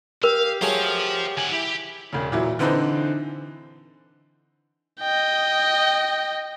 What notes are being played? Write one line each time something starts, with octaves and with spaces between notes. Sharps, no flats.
G4 A#4 F5
F#3 A3 G#4 C5 F5
D#3 F#5 G#5
E4 G4
E1 C#3
A#2 E3 F#3 E4
D3 E3 C4 D4 D#4 B4
D#5 G5